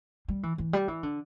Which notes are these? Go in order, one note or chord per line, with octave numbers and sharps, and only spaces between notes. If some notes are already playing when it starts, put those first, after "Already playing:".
G3
E3
E3
G3
E3
D3